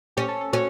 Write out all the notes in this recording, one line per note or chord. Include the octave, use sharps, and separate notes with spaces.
C#4 G4
A4
A4
C#4 F#4